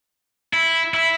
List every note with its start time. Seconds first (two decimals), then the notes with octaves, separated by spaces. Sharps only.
0.53 E4
0.94 E4